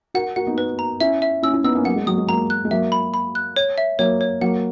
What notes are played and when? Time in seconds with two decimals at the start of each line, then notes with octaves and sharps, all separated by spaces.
0.14 F#4 A#4 F#5
0.36 F#4 A#4 F#5
0.47 B3 D#4
0.58 B4
0.79 A#5
1.00 C#4 E4 E5
1.22 E5
1.43 C#4 E4 E6
1.53 C#4 E4
1.64 B3 D#4 E6
1.75 A#3 C#4
1.85 F#3 A#3 F#5
1.96 G#3
2.07 F#3 D#6
2.18 G#3
2.28 F#3 A#3 A#5
2.50 F#6
2.65 G#3
2.71 F#3 A#3 E5
2.92 B5
3.14 B5
3.35 F#6
3.56 C#5
3.78 E5
3.99 F#3 A#3 C#5
4.21 C#5
4.41 F#3 A#3 F#5